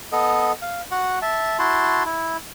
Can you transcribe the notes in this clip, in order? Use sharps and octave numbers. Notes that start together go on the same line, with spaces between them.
B3 A4 D#5
F5
F#4 F#5
E5 A5
E4 F#4 A5 C6
E4